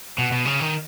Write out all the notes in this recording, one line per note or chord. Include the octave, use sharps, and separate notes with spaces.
B2
B2
C#3
D#3